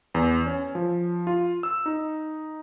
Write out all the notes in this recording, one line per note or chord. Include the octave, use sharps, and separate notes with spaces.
E2
C#4
F3
F4
E6
D#4